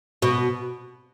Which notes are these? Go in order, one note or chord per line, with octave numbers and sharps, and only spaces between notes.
B2